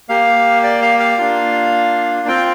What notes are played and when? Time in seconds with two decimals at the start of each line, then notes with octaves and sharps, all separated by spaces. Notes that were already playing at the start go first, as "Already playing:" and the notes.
0.09 A#3 G4 F5
0.64 D5
0.82 F5
1.00 F5
1.18 A#3 D4 F4
2.28 C4 F4 G5